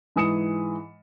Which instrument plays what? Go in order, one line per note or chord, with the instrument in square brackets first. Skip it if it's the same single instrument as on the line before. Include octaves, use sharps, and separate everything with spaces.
[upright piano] G#2 E3 D#6 C#7 E7